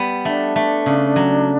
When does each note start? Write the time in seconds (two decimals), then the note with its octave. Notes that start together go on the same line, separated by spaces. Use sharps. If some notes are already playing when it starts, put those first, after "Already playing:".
Already playing: G3 B3
0.25 A3 D4
0.56 A3
0.86 C#3
1.16 F#3